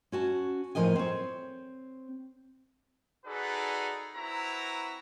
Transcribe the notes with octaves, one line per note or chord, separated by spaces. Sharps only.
C#4 F#4 A5
A2 F3 F#3 A#4 D#5 G#5
C4 C#5
D#4 F#4 G#4 A4 B4 D5
C4 E4 F#4 B4 A#5